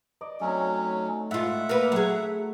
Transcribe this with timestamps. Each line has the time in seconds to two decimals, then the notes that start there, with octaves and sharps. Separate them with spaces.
0.21 D5 D#5
0.41 F#3 A3 C4 C#4 D#4
1.31 G#2 E4 F4 E5 F#5
1.69 A#3 B4
1.92 F#3 A3 G#4